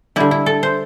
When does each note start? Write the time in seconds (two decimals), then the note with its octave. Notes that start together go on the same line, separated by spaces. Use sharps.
0.16 D3 G3 E4
0.31 E4
0.46 A4
0.63 C5